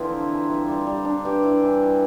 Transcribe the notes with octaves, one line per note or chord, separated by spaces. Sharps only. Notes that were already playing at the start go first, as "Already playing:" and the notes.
Already playing: D3 E3 F3 C4
A#3
F3
G3
G3
G3
D4
G2 G4
E4
E3
E4